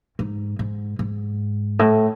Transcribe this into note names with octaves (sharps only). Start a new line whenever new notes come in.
G#2
G#2
G#2
A2